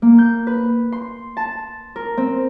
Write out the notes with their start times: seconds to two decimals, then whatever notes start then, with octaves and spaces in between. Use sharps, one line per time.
0.02 A#3
0.18 G6
0.47 B4
0.92 C6
1.37 A5
1.96 A#4
2.17 C4